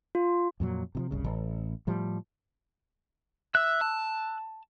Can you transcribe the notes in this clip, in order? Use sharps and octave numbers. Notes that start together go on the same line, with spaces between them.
F4
F2 A#2 F#3
C3 E3 F3
F#1 C2 C#3
A1
A2 F3 G3
E5 E6 F#6
A5